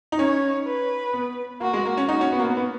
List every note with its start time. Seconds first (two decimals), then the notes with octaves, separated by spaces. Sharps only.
0.12 D#4
0.19 C#4 C#5
0.66 B4
1.13 B3
1.61 A#3 F#4
1.73 G#3
1.85 A#3
1.97 C#4
2.09 D#4 F#4
2.21 C#4
2.32 B3
2.39 A#3
2.44 B3
2.57 B3